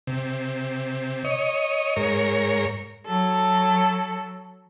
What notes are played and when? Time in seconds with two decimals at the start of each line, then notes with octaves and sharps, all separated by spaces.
0.07 C3
1.25 C#5 D#5
1.96 G#2 A#4 C#5
3.05 F#3 A4